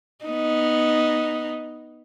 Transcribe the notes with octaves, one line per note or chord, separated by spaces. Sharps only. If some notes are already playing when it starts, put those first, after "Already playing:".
B3 D#4